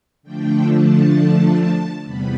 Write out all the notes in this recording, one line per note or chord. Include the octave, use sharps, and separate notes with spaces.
D3 F3 A3 D4 G5
A5
E2 C3 G3 B3 B5